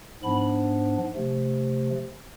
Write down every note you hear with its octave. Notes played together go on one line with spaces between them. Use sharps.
G#2 F3 B3 D4 B5
C3 F3 A3